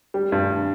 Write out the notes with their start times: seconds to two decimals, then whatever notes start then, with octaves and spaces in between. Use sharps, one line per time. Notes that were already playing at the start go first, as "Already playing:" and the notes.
0.14 G3
0.32 G2